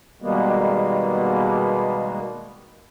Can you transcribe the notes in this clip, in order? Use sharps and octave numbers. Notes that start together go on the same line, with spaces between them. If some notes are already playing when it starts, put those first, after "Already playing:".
B2 D#3 G3 G#3 A#3 B3